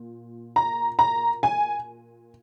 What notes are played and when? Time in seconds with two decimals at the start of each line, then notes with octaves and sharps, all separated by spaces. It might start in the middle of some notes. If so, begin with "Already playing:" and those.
Already playing: A#2
0.56 A#5
0.99 A#5
1.43 G#5